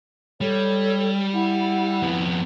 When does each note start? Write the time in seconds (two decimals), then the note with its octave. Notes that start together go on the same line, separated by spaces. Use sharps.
0.41 G3 A4 C#5
1.34 E4 F#5
2.02 F2 B3